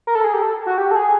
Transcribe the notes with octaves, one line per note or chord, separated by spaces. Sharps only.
A#4
A4
G#4
G4
A4
F#4
G4
A4
G#4